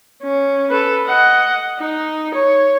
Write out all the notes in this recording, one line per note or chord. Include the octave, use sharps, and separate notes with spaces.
C#4
A4 B4
D#5 F#5
D#4
C#5